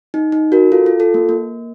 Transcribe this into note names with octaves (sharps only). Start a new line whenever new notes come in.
D#4
D#4
F#4 A#4
F4 A4
F4
F4 A4
A#3
A#3